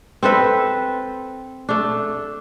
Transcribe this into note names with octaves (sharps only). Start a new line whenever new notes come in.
C4 A4 B4 E5
A3 D4